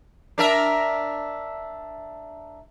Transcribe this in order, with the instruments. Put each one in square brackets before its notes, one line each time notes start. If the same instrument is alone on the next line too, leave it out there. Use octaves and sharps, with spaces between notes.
[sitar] D4 A#4 E5